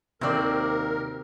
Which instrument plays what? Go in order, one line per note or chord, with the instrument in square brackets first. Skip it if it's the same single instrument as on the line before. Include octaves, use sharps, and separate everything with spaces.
[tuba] D#2 [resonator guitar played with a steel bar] C3 D5 [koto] F#3 C4 [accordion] A#4